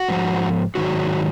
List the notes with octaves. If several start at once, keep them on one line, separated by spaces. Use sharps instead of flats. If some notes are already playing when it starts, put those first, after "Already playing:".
Already playing: F#4
G#2 F3
G#2 D#3 F#3 F#4